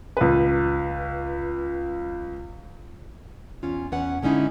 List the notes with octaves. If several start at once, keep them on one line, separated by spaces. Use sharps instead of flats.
C#2 B4
E2 C#4 F4
E2 C#4 B4 F#5
D3 G#3 C#4 D#4 E4